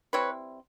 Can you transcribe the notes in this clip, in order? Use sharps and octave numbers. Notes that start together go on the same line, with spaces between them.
G3 C4 E4 B4 C#5